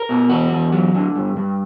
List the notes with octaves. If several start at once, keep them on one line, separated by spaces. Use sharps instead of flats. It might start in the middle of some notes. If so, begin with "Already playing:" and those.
Already playing: A#4
B2
E2 F#4
E2
F#3
D3
G2
G2